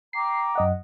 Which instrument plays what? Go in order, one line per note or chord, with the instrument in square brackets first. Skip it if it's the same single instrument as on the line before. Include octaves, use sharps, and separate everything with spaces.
[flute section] G5 A#5 D6 [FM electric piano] C7
[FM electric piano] F#2 D#5 F#5